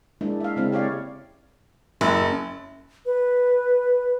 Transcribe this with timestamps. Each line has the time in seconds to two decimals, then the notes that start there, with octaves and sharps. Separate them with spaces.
0.21 G#3 A#3 D4 E4
0.40 E5 F5
0.56 C#3 G#3 C4 E4
0.72 G4 C#5 D5 F5
2.01 F#1 E4
3.06 B4